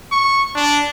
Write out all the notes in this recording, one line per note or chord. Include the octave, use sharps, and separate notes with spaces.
C#6
D4